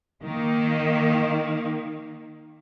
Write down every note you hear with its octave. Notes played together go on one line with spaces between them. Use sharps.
D#3 A#3